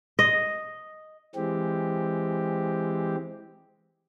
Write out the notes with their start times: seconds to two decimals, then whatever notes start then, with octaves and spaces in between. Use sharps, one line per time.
0.19 D#5
1.35 E3 G#3 C4 G4